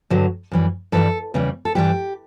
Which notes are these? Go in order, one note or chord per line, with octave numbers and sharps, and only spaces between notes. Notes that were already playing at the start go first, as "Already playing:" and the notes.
G2 D3 F#3
F#2 E3 G3
G2 E3 G3 A4
E2 C#3 E3 G3
A4
G2 E3 G3 G4